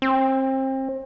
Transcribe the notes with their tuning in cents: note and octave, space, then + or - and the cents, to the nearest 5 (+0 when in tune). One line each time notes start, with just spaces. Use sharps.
C4 +30